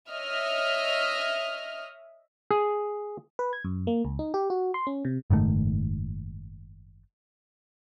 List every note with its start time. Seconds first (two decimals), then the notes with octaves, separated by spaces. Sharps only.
0.11 C#5 D#5 E5 F6
2.51 G#4
3.39 B4
3.53 G#6
3.64 F#2
3.87 A#3
4.05 C#2
4.19 D#4
4.34 G4
4.50 F#4
4.74 C6
4.87 C#4
5.05 C3
5.30 F#1 G#2 D#3 A3